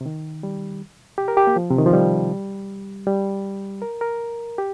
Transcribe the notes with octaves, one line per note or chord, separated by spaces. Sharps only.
C3
D#3
G3
G4
A#4
G4
A#3
F3
C3
D#3
F3
G3
G3
A#4
A#4
G4